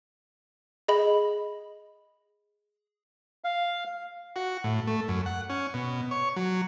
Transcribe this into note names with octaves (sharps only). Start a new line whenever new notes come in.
G#4 D#5 B5 F#7
F5
F#4
A2
A3
F#2
F#5
C#4
B2
C#5
F#3